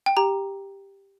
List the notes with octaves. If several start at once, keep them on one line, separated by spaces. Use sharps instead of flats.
G5
G4 A#5